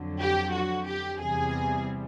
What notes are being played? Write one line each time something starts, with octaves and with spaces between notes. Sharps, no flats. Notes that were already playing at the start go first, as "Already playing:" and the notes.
Already playing: F2 D3 F#3
G4
F#4
G4
E2 C3 E3 G3 G#4